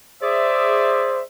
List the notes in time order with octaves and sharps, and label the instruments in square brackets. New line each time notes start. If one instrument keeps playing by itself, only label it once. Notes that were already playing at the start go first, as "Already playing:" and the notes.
[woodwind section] G#4 D5 E5 [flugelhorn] C5